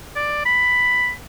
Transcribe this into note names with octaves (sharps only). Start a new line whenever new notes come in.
D5
B5